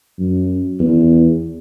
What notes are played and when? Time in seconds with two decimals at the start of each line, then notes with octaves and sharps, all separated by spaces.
0.19 F#2
0.80 E2